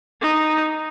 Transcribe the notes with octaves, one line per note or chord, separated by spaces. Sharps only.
D#4